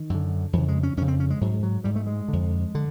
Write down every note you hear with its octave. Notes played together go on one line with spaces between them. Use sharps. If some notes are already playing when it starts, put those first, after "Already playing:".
Already playing: D#3
F#2 D3
F2 C#3 E3
G#3
C#4
F2 C#3 C#4
C4
C#4
G#3
G#2 F#3
F#3
G#2 G3
A3
G#3
F2 D3
D3